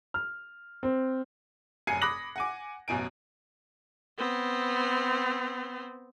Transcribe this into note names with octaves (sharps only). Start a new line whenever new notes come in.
F6
C4
F1 F#2 G#5 G#6 C7 C#7
B5 D6 D#6 F#6 A#6 F#7
F#5 G#5 D6
A1 F#2 B2 G#5 D7
B3 C4